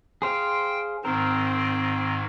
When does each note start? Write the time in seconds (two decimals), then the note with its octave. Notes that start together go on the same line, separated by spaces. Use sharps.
0.22 G#4 C5 F5 G5
1.05 G#2 D#3 C4 A#4